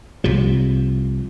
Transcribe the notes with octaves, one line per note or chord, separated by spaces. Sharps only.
C2 C3 F3